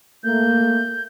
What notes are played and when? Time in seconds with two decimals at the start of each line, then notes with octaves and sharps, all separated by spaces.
0.24 A3 A#3 G6